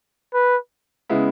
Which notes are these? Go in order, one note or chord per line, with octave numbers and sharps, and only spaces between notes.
B4
C#3 G#3 B3 E4